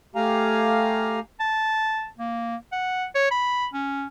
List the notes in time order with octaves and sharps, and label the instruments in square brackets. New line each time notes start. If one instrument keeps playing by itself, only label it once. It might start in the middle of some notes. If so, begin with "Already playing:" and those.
[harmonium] A3 G4 F5 G#5 A#5
[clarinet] A5
A#3
F#5
C#5
B5
C#4